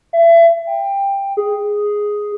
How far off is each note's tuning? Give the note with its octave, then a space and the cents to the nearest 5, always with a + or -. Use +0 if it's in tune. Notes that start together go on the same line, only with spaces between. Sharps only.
E5 +30
G5 +15
G#4 +0